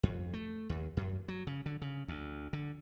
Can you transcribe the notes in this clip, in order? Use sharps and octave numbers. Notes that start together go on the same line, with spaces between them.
F2
A3
D#2
F#2
F#3
C#3
D3
C#3
D2
D3